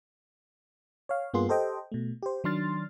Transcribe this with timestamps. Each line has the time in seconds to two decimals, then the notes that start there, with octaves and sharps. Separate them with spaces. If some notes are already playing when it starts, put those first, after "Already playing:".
1.09 C#5 F5
1.34 G2 A#3 B3 F4 G#4 C6
1.49 G4 A4 C5 D#5 G5
1.92 B2 A3
2.22 G4 C5
2.44 D#3 F#3 D4 C6 F6 A6